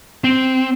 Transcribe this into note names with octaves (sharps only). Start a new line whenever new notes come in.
C4